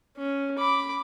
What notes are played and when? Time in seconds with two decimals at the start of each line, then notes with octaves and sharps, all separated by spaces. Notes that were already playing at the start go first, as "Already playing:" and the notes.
0.17 C#4
0.58 B5 D6